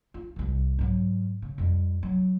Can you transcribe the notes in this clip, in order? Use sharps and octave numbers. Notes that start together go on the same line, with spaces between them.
F4
C2 D#3
G#2 F#3
C#3
F2 G3
F#3